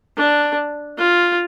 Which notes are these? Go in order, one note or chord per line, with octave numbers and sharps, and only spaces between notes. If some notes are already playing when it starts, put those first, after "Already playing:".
D4
F4